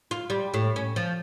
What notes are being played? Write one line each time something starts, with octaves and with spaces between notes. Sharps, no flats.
F4
G3
A2
C#4
F3